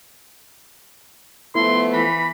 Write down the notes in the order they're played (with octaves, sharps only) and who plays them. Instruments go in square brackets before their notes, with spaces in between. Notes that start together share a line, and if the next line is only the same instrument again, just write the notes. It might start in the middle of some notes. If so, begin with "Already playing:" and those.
[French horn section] F3 A3 B3 [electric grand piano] E4 [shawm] C6
[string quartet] E3 [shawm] B5